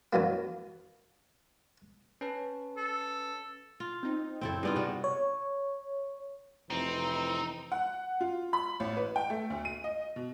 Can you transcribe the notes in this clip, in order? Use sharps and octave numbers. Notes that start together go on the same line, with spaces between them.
F#2 D#3 E3 F#3 A#3
C#4 B4 A5
A4
F4
C4 D#4
F#2 C#3 C4 E4 A4 G5
G2 B3 D#4 F4 G#4 D5
C3 F#4
C#5
F1 E3 C4 D#4
F#5
F4
B5
A1
B4
G5
A3
D2
D#7
D#5
B2